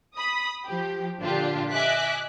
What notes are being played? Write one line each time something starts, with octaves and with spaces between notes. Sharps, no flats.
B5 D#6
F3 G4
A#2 D3 D4 F4 G4
D#5 E5 G#5 D6 F#6 B6